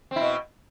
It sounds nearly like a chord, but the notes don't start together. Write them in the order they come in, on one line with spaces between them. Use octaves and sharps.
C4 E4 B2